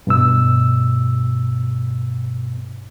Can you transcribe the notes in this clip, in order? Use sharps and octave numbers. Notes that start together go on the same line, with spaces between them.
G2 B2 E6